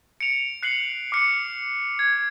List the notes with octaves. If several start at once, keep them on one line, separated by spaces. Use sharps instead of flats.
C#7 D7 F7
F#6 C7 C#7 F#7
D6 F6 C#7
G#6